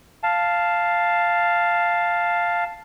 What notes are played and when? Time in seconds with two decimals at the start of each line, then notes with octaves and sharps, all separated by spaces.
0.23 F5 A5